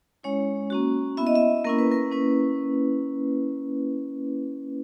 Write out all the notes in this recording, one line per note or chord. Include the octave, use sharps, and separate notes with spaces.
G#3 C#4 E4 C#5
A#3 C#4 F#4
B3 E4 E5
D#5
E5
A#3 C#4 E4 A#4
B4
A#4
A#3 C#4 E4 B4